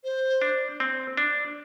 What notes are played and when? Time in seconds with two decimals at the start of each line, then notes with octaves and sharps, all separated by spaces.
0.04 C5
0.42 D4
0.80 C4
1.17 D4